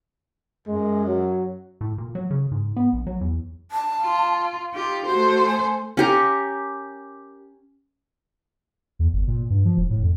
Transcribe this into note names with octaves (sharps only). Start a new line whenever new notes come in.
F#2 G#3
F#3
A2
A#2
F#3
C#3
G#2
B3
A#1
F#3
E2
A5
F4
D#4 F4 G4
A3 F#4 C5
G#5
C#4 G4 A#4
E2
G1
A#2
G2
F3
E1
A2
F2